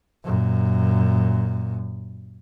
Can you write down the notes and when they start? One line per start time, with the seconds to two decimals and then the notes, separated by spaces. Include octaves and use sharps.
0.25 F#2 A#2